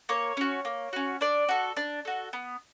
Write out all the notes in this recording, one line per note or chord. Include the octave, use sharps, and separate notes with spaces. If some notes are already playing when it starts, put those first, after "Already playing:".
A#3 C#5
C#4 F#4
A#3
C#4 F#4
D4 D5
F#4 A4
D4
F#4 A4
B3